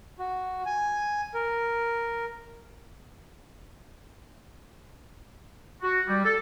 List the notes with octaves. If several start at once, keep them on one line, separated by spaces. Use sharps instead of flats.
F#4
G#5
A#4
F#4
G3
A4